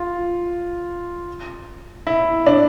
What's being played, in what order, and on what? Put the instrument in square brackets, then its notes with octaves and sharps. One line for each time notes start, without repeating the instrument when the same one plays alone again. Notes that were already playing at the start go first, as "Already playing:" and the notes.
Already playing: [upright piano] F4
E4
D4